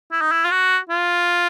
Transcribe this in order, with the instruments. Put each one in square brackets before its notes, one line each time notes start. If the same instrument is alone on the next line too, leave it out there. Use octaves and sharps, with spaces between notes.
[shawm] E4
D#4
E4
F4
F#4
F4